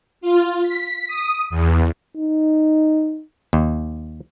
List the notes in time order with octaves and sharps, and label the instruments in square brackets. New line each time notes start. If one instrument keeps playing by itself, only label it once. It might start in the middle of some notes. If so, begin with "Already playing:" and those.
[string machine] F4
B6
D#6
E2
[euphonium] D#4
[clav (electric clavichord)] D#2